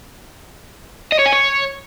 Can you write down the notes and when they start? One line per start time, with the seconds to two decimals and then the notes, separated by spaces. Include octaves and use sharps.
1.12 D#5
1.19 C#5
1.26 G#5
1.33 C#5